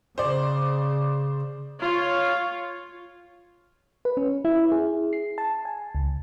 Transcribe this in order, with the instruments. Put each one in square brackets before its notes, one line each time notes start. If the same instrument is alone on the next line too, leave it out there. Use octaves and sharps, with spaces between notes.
[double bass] C#3 [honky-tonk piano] C5 D5
[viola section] F4 C#5
[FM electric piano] B4
C#4
E4
G#4
C7
A5
G#5
C#2